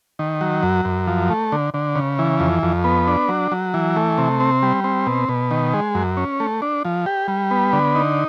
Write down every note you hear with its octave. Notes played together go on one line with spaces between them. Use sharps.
D#3
F#3
F#2
F#2
F3
A3
D3
D3
C#3
E3
F2
F2
B3
D4
F#3
F#3
E3
A3
C3
C4
G3
C4
B2
B2
D#3
G#3
F#2
C#4
A3
D4
F3
G4
G3
B3
D3
D#4